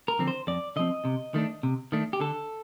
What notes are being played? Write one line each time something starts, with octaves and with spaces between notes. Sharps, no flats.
A#4
D3 F3 C4
C5
F2 D5
D3 F3 C4 D#5
C3
D#3 A3 D4
C3
D#3 A3 D4
G4
D3 A4